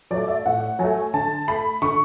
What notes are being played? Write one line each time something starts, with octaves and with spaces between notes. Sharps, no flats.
F#3 A3 D5
E5
A2 F#5
F#3 A3 G#5
D3 A5
A3 B5
D3 C#6